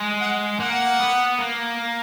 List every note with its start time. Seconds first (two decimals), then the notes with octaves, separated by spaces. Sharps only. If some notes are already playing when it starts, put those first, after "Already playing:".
Already playing: G#3
0.20 F#5
0.59 A#3 F#5
0.99 B3
1.39 A#3